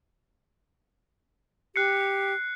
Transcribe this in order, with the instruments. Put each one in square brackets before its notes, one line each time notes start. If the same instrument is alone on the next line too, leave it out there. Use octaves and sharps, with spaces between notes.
[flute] G4 [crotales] F#6 C7 C#7